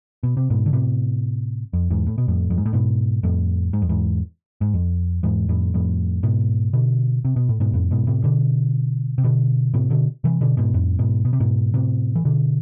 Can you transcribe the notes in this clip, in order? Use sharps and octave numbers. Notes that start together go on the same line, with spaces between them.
B2
C3
G#2 B2
D3
A2 C3
F2
E2 G#2
A2
B2
F2 A2
F2
G#2
A2
G#2 B2
F2 A2
G#2
F2
E2 G#2
G#2
F2
E2 G#2
F2 A2
F2 A2
G#2 B2
B2 D3
C3
B2
A2
G#2 B2
F2 A2
G#2 B2
A2 C3
B2 D3
C3
B2 D3
A2 C3
B2 D3
C3 E3
B2 D3
G#2 B2
F2 A2
G#2 B2
B2
C3
G#2 B2
A2 C3
E3
B2 D3